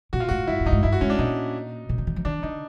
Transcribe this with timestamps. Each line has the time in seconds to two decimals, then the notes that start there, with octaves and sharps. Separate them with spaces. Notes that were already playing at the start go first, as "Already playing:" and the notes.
0.13 A#2 F#4
0.20 F4
0.29 A2 F#4
0.47 G2 E4
0.60 G2
0.66 A2 D#4
0.72 G#2
0.83 G2 E4
0.92 F#4
1.01 G#2 C#4
1.10 D4
1.19 A#2 D#4
1.89 A#2
1.98 D3
2.07 D#3
2.16 F3
2.25 D#3 D4
2.43 D3 D#4